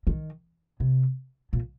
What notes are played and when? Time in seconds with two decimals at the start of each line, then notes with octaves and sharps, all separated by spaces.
0.07 D#3
0.80 C3
1.53 A#2